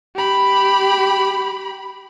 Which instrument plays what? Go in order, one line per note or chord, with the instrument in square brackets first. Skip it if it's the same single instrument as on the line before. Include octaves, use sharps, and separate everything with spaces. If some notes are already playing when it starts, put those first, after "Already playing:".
[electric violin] G4 B5